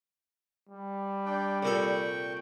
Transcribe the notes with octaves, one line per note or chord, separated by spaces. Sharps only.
G3
D4 G5
C2 A#2 A4 G5 C#6